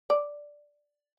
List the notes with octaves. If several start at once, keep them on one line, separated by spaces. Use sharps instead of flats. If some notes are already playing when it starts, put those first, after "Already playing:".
D5